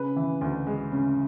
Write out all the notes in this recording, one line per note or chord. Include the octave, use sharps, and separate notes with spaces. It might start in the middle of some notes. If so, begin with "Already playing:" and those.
Already playing: C#3 B4
E3
D2
G#3
C#3